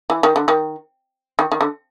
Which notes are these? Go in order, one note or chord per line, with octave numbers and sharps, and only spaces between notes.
E3
D#3
D3
D#3
D#3
D#3
D3